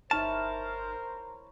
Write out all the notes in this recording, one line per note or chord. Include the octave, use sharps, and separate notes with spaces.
G1 D#4 E4 A#4 C5 C#5 A5 F6